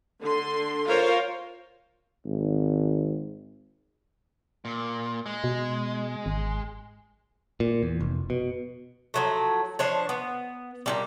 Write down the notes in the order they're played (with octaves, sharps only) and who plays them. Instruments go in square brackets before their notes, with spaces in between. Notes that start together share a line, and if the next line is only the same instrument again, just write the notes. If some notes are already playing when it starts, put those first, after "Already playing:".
[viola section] D3 C6
F4 A#4 C5 C#5 F5
[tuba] G#1
[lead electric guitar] A#2
G#3
[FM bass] B2
G#1
[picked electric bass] A#2
E2
F1
B2
[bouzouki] F3 F#3 A3
F3 D4 C5 C#5
B3
A#2 D3 G3